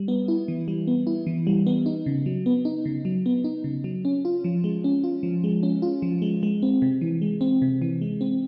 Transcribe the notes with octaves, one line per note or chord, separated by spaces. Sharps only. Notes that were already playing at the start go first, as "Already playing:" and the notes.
Already playing: G3
B3
E4
E3
G3
B3
E4
E3
G3
B3
D#4
C#3
F#3
B3
D#4
C#3
F#3
B3
D#4
C#3
F#3
C#4
F4
F3
G#3
C#4
F4
F3
G#3
C#4
F4
F3
G#3
G#3
C4
C3
E3
G#3
C4
C3
E3
G#3
C4